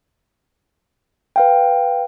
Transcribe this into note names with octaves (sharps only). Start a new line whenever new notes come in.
B4 F5 G5